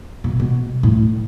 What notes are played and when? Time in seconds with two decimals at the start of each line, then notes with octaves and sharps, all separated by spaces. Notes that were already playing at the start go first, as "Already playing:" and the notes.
0.24 B2
0.40 B2
0.83 A2